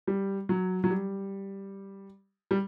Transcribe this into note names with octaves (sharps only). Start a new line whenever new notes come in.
G3
F#3
F#3
G3
G3